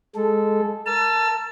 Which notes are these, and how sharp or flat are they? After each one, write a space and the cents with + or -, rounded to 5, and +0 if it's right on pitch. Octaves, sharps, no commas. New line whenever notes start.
G#3 +0 A4 -10
A#4 +0 A5 +0 E6 +35